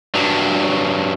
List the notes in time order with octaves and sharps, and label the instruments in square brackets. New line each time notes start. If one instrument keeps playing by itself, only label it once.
[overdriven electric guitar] G2 F#3